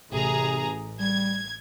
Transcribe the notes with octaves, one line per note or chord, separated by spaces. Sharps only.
A1 C3 G#4 A#5
G3 G#6